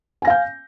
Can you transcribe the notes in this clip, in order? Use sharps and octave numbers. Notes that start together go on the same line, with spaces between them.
F5 G#5 G6 A#6